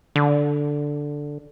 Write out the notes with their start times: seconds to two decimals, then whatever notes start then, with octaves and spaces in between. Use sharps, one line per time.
0.16 D3